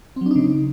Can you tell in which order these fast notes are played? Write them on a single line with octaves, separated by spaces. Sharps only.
C4 F#3 D4 D#4 C#3